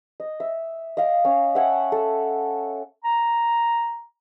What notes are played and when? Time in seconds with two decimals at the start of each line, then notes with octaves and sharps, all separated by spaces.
0.20 D#5
0.40 E5
0.97 D#5 F5 D6
1.25 C#4
1.55 E5 F#5 G#5 A5
1.92 A4
3.04 A#5